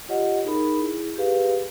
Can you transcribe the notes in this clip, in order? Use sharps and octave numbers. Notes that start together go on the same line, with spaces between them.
F4 G4 C#5 D#5 F#5
D#4 G#4 A#4 B5
E4 G#4
G4 G#4 B4 F5